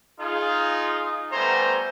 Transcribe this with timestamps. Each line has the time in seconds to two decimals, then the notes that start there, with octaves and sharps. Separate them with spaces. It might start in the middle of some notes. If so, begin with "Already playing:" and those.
0.19 D#4 F4 G#4
1.32 G3 A3 B3 C5 G#5 A#5